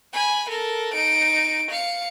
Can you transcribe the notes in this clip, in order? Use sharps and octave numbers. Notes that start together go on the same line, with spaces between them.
G#5 B5
A4 A#4
D#4 D7
F5 C#7